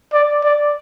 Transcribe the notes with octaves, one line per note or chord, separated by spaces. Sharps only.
D5
D5